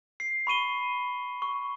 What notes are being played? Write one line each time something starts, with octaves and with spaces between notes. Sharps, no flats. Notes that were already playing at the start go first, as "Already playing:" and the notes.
C7
B5 C#6 D#7 G7
C#6